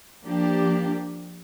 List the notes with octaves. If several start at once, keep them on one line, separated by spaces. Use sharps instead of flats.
F3 A#3 D4 G4